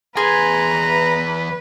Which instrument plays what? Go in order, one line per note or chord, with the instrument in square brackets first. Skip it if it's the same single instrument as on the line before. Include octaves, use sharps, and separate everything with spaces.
[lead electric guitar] E2 C6 [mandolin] G#4 [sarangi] B4 [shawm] A#5